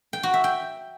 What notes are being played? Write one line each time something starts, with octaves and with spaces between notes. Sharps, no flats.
G5
F#4
E5
G5